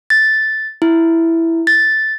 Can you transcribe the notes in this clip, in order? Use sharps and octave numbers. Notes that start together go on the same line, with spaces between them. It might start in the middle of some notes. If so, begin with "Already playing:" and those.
A6
E4
A6